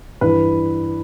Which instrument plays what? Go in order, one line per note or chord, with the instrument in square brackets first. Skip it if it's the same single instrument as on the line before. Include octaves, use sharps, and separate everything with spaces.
[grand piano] G2 E3 B4